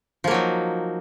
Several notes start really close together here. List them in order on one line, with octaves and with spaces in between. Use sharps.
F3 A#3 F#3 D#4